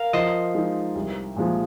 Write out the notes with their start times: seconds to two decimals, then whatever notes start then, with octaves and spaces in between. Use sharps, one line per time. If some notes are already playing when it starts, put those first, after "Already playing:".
Already playing: A#4 F5
0.13 F3 C5 D#5
0.55 G#3 D#4
0.95 C2
1.36 A#2 F3 G#3